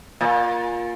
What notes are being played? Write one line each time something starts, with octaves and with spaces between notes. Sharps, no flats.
A#2